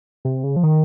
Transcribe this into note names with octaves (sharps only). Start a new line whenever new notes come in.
C3
C#3
F3
D#3